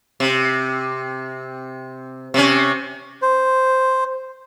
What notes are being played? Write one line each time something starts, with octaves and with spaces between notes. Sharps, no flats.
C3
C3 C#4
C5